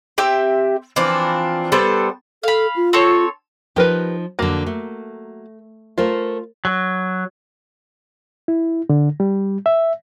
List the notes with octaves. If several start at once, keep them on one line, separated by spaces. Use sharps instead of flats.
C4 G4 E5 G5
E3 F3 C4 D4
G3 B3 A4 C5
A4 F5 B5
F4
C4 A4 C#5
F3 D#4 G4 A#4 B4
F2 D3 F#3 A#3 F#4
A3
A3 F4 A#4 C5
F#3
E4
D3
G3
E5